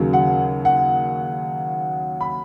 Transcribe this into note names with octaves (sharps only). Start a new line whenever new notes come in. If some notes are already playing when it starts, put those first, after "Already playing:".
Already playing: D#2 C#3 F#3
F#5
F#5
B5